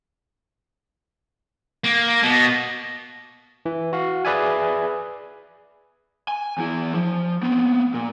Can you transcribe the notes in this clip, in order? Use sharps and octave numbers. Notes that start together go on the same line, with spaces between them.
A#3
B2
E3
F#4 F5
G#4 B4 D5 E5 G#5
G#5
E2 E4
F3
B3 C4
A#2